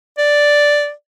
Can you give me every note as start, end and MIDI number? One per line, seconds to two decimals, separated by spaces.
0.18 0.92 74